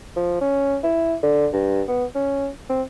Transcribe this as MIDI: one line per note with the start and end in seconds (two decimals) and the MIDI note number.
0.16 0.37 53
0.41 0.77 61
0.83 1.15 64
1.23 1.48 50
1.53 1.82 43
1.88 2.05 59
2.15 2.48 61
2.69 2.82 60